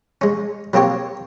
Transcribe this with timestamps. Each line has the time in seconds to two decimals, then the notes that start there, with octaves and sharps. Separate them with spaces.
0.21 G#3 C#4
0.73 F#3 A#3 C4 G4 C#5